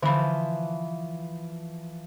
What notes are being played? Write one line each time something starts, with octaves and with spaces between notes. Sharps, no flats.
D3 E3 F3 B5